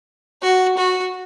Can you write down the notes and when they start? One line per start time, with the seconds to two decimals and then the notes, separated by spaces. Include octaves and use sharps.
0.42 F#4
0.77 F#4